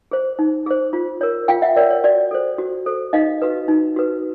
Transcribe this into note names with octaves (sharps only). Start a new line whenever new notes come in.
G#4 C5
D#4
G#4 C5
F4
A#4 C#5
F4 F5 G5
E5 F#5
A#4 C#5 D5
C#5
F#4 D5
A4 C5
F#4
A4 C5
D#4 D#5 F5
F#4 B4
D#4
F#4 B4